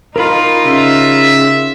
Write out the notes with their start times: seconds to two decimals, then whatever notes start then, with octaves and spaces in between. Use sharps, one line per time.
0.16 D#4 F4 A#4 B5
0.66 C#3 E5